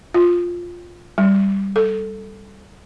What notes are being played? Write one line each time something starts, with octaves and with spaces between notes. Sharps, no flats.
F4
G3
A4